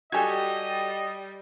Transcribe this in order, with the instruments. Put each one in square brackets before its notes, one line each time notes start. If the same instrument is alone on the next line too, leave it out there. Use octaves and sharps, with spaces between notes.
[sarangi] G3 [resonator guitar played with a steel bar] F#4 G4 A4 [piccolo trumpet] D#5 [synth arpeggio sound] G#5 G#6